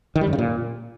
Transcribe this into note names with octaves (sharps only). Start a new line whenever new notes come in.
D#3
G3
F#2
C#3
A#2